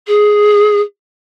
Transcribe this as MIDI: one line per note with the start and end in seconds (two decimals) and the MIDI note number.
0.07 0.81 68